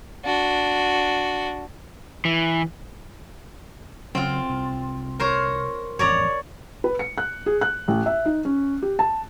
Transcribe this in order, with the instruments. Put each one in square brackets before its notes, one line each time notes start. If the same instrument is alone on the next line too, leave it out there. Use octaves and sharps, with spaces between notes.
[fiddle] D4 F#4
[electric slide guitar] E3
[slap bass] C#3 F#3 C#4 [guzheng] C4 F4
[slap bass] C2
[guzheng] A#4 C5 C#5
[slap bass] A1 F2 G#2 [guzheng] C#5 D5 A#5
[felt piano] B4
C#7
F#6
G#4
F#6
A1
E5
D#4
C#4
G4
A5